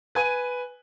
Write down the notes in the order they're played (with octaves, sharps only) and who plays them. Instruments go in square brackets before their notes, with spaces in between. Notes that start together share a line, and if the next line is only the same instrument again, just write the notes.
[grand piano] B4 G#5